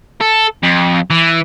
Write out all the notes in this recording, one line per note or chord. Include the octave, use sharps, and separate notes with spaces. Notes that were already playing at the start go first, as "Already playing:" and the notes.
A4
F2
E3